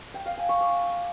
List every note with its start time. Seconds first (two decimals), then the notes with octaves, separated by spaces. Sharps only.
0.14 G5
0.26 F5
0.37 G#5
0.49 C#6
0.61 D6